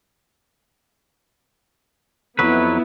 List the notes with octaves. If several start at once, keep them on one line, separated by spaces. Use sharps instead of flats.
F2 F#3 B3 E4 B4